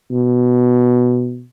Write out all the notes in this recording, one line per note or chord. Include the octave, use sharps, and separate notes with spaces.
B2